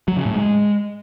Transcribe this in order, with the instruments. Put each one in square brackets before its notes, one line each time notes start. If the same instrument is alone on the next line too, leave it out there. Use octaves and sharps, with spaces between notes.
[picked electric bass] F#3
C#3
A2
G#3